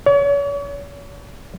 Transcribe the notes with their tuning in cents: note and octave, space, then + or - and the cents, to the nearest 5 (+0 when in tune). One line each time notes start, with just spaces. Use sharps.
C#5 +40